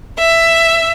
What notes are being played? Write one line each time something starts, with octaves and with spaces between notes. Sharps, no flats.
E5